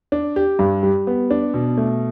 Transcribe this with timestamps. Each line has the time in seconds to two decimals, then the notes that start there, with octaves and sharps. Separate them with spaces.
0.12 D4
0.36 G4
0.59 G2
0.83 G3
1.07 B3
1.30 D4
1.54 B2
1.77 A3